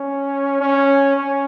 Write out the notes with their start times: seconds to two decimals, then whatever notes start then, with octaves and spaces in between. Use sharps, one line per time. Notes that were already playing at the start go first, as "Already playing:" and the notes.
Already playing: C#4
0.61 C#4
1.16 C#4